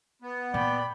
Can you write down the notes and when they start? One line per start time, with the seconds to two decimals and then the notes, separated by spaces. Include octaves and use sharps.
0.22 B3
0.54 A#2 D5 G5 B5